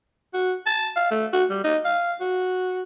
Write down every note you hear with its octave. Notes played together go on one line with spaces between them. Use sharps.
F#4
A5
F5
A3
F#4
G3
D#4
F5
F#4